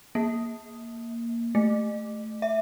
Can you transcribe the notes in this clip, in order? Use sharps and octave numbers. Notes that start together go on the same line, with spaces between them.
A#3
A3
E5